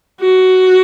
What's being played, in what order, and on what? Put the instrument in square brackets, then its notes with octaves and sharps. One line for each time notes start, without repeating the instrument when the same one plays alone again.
[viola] F#4